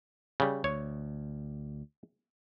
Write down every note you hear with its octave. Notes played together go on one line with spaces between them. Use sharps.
C#3 G3
D2 C#5